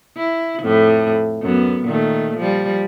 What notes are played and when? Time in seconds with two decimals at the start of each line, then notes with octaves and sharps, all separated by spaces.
0.17 E4
0.60 F2 A2
1.42 F#2 B3
1.85 A#2 D#3 A3
2.37 F3 G3